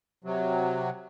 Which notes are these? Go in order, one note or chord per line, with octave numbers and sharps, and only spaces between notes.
C3 F#3